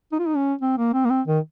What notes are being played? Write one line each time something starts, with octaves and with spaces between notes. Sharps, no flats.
D#4
F4
D#4
C#4
C4
A#3
C4
A#3
C4
D#3